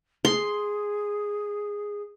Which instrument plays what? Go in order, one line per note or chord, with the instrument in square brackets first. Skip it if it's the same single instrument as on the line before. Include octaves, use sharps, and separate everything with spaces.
[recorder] G#4 [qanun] C6